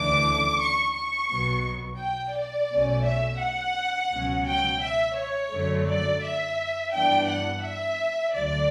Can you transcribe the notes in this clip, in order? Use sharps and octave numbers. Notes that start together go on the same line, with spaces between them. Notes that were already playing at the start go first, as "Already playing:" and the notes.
Already playing: D2 C#3 E3 A3 D4 D6
C#6
C#6
B1 B2 F#3 B3
G5
D5
B1 B2 A3 C#4
E5
F#5
C#2 B2 F#3 C#4
G5
E5
C#5
F#2 D3 F#3 A3
D5
E5
G2 E3 B3 D4 G5
F#5
E5
D2 D3 F#3 D5